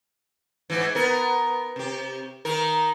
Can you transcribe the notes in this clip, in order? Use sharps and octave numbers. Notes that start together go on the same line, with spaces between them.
G#2 E3
B3 A#4
C3 G4
D#3 D#4 A#4